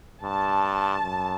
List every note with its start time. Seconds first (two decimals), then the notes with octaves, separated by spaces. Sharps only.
0.23 G2 A5
1.04 F#2